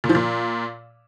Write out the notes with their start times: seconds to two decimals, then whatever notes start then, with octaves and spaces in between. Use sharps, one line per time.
0.04 A#2
0.09 F3
0.15 A#2